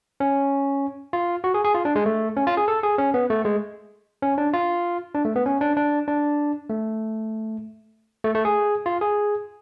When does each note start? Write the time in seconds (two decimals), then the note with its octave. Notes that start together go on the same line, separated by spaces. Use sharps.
0.20 C#4
1.13 F4
1.44 F#4
1.54 G#4
1.64 G#4
1.75 F4
1.85 D4
1.96 G#3
2.06 A3
2.37 C#4
2.47 F4
2.57 G#4
2.68 A4
2.83 G#4
2.98 C#4
3.14 B3
3.30 A3
3.45 G#3
4.22 C#4
4.38 D4
4.53 F4
5.15 D4
5.25 A3
5.36 B3
5.46 C#4
5.61 D4
5.77 D4
6.08 D4
6.70 A3
8.24 A3
8.35 A3
8.45 G#4
8.86 F4
9.01 G#4